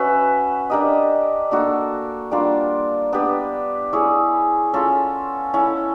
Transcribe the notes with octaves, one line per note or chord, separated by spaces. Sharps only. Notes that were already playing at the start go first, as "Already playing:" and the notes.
Already playing: C#4 F#4 B4 E5
D4 G4 A#4 D#5
A#3 D4 F#4 A4
G3 A#3 D4 F4
B3 D4 G4 B4
E4 G#4 C#5
C#4 F4 A4
C#4 E4 A4